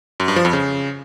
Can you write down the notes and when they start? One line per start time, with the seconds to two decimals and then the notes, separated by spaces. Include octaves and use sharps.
0.20 F#2
0.28 G2
0.36 F3
0.45 F2
0.53 C#3